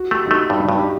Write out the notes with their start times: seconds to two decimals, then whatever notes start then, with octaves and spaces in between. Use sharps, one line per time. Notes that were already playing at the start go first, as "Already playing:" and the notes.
Already playing: F#4
0.11 A3 G4
0.26 D#4
0.31 A3 F#4
0.50 G2 D#4
0.69 G2
0.79 G4